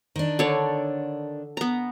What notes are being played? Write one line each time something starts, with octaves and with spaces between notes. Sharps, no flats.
D#3 D4
D3 C#5 D5
B3 A#5